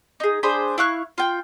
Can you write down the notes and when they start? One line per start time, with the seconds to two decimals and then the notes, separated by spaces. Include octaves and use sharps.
0.20 D#4 G#4
0.43 D4 G#4 C5 B5
0.78 E4 F5 C#6 F#6
1.18 F4 G5